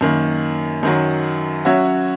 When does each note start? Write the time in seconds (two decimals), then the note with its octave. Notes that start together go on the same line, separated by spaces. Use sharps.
0.01 F#2 D#3 A#3
0.83 F#2 D#3 F#3
1.65 F#3 C#4 F#4 C#5 E5